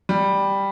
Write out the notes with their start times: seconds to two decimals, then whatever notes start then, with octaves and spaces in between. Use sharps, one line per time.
0.09 G3